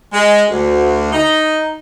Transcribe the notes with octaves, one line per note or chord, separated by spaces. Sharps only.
G#3
D2
D#4